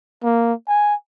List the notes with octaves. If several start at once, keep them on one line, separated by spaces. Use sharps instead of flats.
A#3
G#5